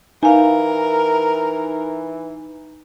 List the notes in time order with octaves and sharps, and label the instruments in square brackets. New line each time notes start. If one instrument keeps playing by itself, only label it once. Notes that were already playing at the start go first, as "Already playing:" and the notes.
[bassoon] E3 [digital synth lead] D#4 [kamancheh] A#4 [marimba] F5 G#5